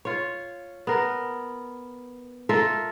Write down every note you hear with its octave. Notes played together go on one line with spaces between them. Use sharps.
F4 C#5
B3 A#4
F4 A4 A#4 E5